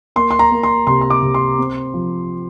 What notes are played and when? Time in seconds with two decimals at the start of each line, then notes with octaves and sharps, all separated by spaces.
0.16 A#3 C6
0.31 C6
0.39 A#5
0.51 A#3
0.63 C6
0.87 C3 C6
1.01 C6
1.10 D6
1.22 C3
1.34 C6
1.58 C4
1.94 F3